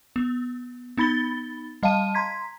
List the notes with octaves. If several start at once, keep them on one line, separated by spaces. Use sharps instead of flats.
B3
B3 D#4 B5 A6 G7
G3 D#5 F5 A5 D#7
A#5 C6 G#6 B6